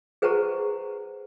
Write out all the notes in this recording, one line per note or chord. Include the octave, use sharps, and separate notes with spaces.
G#4 B4 C5 F#5 A#5 C#6